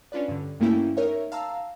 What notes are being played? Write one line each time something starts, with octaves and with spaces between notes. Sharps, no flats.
C#4 D4 F4 B4 D5
G2 D3
G2 A3 A#3 C#4 E4 G5
D#4 A#4 C#5 E5
F5 A5 A#5 E6